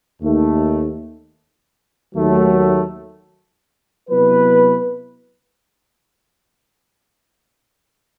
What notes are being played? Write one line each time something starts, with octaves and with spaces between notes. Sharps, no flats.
D#2 D#3 A3
D#2 D#3 F#3 A3
C3 F#3 B3 E4 B4